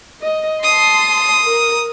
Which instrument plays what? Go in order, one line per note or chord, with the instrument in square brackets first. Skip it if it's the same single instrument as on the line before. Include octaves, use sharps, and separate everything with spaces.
[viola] D#5
[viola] A5 C6 [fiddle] D#6
[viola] A#4